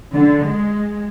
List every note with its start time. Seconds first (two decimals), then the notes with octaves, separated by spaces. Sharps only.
0.11 D3
0.44 G#3